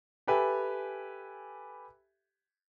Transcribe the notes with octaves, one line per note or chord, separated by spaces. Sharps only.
G4 A4 B4 E5 G#5